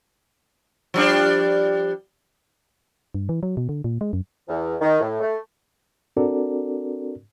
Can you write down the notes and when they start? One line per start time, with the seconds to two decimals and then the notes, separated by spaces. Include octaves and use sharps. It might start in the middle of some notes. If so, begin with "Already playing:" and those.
0.94 F3 G3 D4
3.15 G2
3.29 E3
3.43 F#3
3.57 B2
3.69 D3
3.84 A#2
4.01 G#3
4.13 F#2
4.49 E2
4.81 D#3
5.01 A2
5.21 A3
6.17 C4 D4 F#4 A4 A#4 D5